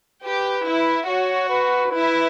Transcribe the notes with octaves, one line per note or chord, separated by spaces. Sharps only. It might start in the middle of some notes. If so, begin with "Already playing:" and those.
G4 B4
E4
F#4 C#5
B4
E4 B4